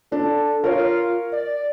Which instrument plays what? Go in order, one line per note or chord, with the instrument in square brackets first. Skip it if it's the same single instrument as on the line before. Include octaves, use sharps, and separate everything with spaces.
[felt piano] D4 [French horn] A4
[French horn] F4 [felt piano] A#4 C#5
[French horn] D5